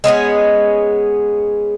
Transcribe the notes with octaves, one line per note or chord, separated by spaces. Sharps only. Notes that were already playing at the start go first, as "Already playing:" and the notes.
G#3 B3 C#4 G#4